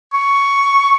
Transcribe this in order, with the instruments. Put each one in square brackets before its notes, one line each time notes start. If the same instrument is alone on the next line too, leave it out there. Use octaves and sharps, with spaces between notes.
[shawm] C#6